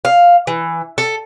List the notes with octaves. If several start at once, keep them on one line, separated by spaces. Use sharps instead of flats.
F5
E3
A4